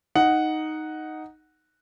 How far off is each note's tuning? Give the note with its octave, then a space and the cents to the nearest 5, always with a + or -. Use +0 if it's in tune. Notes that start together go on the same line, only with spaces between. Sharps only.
D#4 +0 F#5 +0